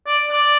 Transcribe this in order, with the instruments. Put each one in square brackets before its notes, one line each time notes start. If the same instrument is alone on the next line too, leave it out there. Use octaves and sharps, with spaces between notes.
[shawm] D5
D5